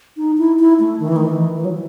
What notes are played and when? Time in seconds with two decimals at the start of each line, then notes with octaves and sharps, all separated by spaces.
0.17 D#4
0.38 E4
0.59 E4
0.80 A3
1.00 D#3
1.08 E3
1.16 D#3
1.28 E3
1.56 E3
1.65 F#3
1.73 E3